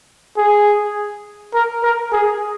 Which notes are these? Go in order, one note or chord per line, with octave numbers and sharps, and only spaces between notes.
G#4
A#4
A#4
G#4